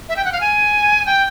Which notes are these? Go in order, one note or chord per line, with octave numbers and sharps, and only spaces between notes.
E5
G5
F#5
F5
G#5
G5